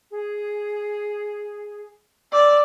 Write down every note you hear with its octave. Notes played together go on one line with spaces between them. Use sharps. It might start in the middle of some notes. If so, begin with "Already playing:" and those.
G#4
D5 E6